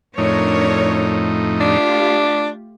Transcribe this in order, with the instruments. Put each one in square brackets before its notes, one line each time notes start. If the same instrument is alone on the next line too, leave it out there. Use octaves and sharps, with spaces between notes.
[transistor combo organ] F2 A2 D#4 [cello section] D4 A#4 C#5
[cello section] A3 F4 G4 [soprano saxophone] D4